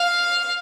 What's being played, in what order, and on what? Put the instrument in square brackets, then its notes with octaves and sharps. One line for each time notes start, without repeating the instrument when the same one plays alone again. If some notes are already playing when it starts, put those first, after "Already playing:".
Already playing: [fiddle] F5